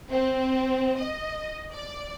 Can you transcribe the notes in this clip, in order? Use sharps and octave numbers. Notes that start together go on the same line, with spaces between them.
C4
D#5
D5